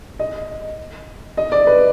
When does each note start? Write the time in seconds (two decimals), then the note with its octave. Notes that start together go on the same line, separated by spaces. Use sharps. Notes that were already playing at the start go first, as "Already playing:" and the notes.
0.19 D#5
1.37 D#5
1.52 D5
1.67 B4